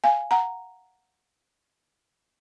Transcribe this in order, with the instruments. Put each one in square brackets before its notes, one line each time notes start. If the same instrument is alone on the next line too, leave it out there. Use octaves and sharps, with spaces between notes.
[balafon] F5 G#5
F#5 A#5